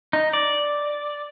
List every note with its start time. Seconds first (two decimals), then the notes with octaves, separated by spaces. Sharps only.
0.13 D#4
0.33 D5